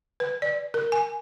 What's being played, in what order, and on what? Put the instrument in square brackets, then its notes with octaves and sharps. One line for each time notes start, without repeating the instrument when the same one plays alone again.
[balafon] B4
D5
A#4
G#5